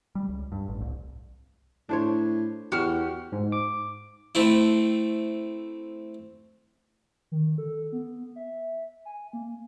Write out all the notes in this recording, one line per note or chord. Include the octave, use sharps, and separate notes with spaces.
G3
C#2
G2
A1
C2
A2 D4 C5 C#5
E2 F#4 G4 F6
G#2
D6
A3 C4 E4
D#3
A4
B3
E5
G#5
A#3